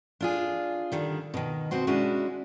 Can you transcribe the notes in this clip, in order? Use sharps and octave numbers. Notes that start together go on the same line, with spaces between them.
D4 F4 G#4
D3 D#3 G3
B2 D#3
B2 C4 F#4 C5
G#3 C#4 D4 E4 F#4